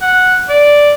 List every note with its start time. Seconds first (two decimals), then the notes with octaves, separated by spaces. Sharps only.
0.01 F#5
0.49 D5